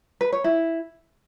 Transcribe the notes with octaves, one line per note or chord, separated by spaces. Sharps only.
B4
C#5
E4